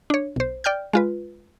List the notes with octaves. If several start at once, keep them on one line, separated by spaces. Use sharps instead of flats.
D4 C#5
B1 C5
D5 G5 F6 G6
G#3 F4 B4